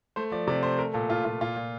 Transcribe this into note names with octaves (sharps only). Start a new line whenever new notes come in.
A3 C5
F3 D5
C3 D5
A3 C5
A3 A#4
A#2 A4
A#2 F4
A#2 F4
A#2 F4
A#2